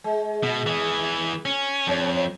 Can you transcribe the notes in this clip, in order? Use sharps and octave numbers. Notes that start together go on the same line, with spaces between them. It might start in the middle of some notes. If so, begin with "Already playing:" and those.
G#3
B2
E3 G#4
C#4
F2 C#4 C#5